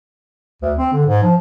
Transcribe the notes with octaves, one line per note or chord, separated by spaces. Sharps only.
D2
C4
D3
G#2
F3